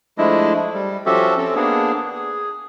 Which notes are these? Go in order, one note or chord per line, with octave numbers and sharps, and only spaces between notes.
F3 G#3 A3 D4 E4 D#5
G3
F3 C#4 F#4 G4 A4 E5
C4 C#4 A4
A#3 B3 D4 G#4
G#4